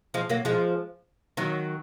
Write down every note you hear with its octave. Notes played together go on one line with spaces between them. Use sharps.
F3 G#3
F#3 A#3
F3 G#3
D#3 F#3